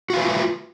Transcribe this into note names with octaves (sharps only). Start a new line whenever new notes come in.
F4 F#4 B4 E5 F5